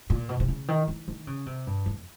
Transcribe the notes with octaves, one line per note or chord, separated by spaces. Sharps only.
A#2
B2
C3
C#3
D#3
D#3
D#3
C#3
C3
G2
F2